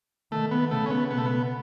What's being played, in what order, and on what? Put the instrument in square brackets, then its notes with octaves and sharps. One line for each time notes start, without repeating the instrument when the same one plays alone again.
[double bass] D#3 [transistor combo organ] A3
[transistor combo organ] B3
[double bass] C#3 [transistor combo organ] A3
[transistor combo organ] C#4
B3
[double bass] B2 [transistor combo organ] B3
[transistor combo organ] A3
B3